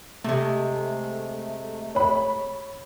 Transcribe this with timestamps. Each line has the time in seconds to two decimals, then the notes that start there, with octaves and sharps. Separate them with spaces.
0.24 C3 G#3 A3
1.95 C#5 B5